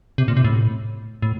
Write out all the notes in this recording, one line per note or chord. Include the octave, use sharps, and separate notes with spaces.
C3
A#2
C3
A2
A2